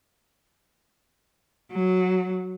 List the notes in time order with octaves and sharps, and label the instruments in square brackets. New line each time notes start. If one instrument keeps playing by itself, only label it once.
[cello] F#3